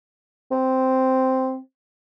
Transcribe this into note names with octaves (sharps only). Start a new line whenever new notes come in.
C4